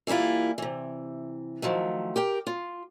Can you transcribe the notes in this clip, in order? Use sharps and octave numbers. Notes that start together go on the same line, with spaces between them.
E3 G3 A#3 E4 F4
C3 E3
D#3 F3 F#3 A3
G4 A#4 G5
F4